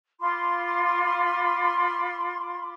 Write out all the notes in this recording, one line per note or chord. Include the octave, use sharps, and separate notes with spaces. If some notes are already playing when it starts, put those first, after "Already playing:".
F4 B5 C6 D6